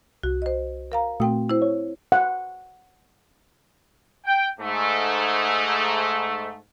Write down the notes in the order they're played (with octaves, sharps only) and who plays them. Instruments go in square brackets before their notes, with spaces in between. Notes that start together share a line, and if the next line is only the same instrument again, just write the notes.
[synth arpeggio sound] C2 [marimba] F#4
[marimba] C5 D#5
A#4 F5 A#5
[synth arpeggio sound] A#2 A3 F#4 [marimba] C4 G5 D#6
[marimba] E4 C5
[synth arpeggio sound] C#5
[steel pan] F#5
[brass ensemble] G5
G#2 A3